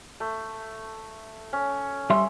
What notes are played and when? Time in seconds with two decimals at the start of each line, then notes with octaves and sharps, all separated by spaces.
0.20 A3
1.53 C#4
2.10 G3 E5 C6